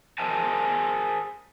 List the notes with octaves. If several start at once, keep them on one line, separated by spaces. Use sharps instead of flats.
G#4 A#4 C5 E5 G#5 A5